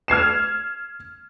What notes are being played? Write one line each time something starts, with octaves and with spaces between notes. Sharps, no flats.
F6 G#6 C7 E7